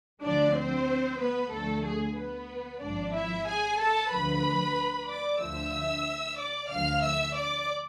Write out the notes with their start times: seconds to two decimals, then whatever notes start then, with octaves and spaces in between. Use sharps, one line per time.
0.22 D2 D3 F3 D4 D5
0.55 C4 C5
1.19 B3 B4
1.51 D2 D3 F3 A3 A4
1.84 G#4
2.16 B3 B4
2.81 G#1 G#2 F3 D4 D5
3.13 E4 E5
3.46 G#4 G#5
3.78 A4 A5
4.11 D2 D3 F3 B4 B5
5.08 D5 D6
5.40 D2 D3 F3 E5 E6
6.37 D5 D6
6.69 D2 D3 F3 F5 F6
7.02 E5 E6
7.35 D5 D6